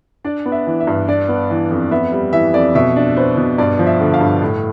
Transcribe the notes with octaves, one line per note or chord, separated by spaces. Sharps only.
D4 D5
B3
E5
E3
E5
G2
D4 D5
B3
E3
F2
B3 E5
G3
E3 E5
F2 D5
B2 E5
D4
B3 C5
B2
G2 D5
F3
E5
D3
F5
G2
A2